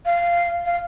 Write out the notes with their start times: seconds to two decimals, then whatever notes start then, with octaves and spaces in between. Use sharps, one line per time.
0.05 F5
0.66 F5